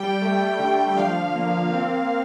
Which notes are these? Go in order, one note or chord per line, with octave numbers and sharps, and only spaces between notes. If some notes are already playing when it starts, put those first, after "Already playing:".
Already playing: G3 G5
A3
D3
F3 F5
A#3
C4